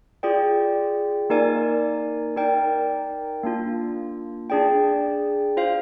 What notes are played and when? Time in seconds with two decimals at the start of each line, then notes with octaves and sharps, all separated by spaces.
0.23 F4 G#4 D5 G5
1.30 A#3 D#4 A#4 D5 G#5
2.36 D#4 A#4 D5 G5
3.43 A#3 D4 F4
4.50 D4 G#4 D5 G5
5.57 F4 C5 F5